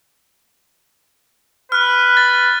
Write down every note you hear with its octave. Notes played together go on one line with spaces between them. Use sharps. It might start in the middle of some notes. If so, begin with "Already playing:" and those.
B4 F6 F#6
A6